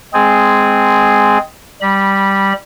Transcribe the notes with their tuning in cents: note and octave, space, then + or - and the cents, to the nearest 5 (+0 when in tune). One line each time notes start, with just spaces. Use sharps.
G#3 +0 C4 -10 G#4 +0
G3 +0 B5 -25